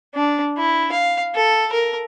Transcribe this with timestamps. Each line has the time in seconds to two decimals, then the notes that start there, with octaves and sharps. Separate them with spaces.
0.15 D4
0.58 E4
0.92 F5
1.35 A4
1.72 A#4